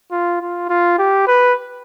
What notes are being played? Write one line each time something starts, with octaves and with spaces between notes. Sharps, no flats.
F4
F4
F4
G4
B4